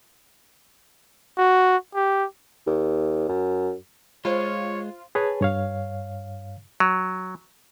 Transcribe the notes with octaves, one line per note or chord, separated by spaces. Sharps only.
F#4
G4
D#2
F#2
G#3 F4 C5 C#5 G5 B5
G#4 B4 C#5 G#5 A5
G2 C#5 F5
F#3